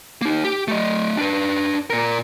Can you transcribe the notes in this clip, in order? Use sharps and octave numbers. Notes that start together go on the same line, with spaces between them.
A#3 D#4
G4
A3 D#5
D4 B4
A#2 A#4